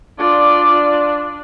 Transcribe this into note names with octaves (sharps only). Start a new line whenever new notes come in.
D4 F4 D5